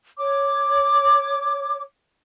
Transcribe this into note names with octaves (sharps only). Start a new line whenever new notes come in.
C#5 D6